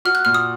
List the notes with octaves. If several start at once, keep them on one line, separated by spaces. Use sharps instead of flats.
F#4 F6
F#6
A#2 F6
D#6